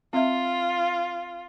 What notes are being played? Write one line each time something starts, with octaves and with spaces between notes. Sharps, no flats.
C4 F4 E5